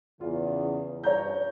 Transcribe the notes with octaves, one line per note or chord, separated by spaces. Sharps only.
E2 C#3 F4
G2 F3 C#5 A#5 G6